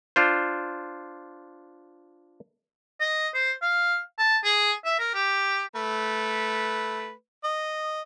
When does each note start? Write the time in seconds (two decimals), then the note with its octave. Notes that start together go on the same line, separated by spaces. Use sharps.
0.16 D4 F4 C5
3.00 D#5
3.34 C5
3.62 F5
4.18 A5
4.44 G#4
4.85 E5
4.99 A#4
5.14 G4
5.76 A3 B4
7.44 D#5